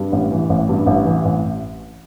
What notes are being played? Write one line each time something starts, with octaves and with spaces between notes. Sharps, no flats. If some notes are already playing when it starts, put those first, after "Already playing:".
Already playing: G2
A1
E3
A1
G2
A1
E3
A1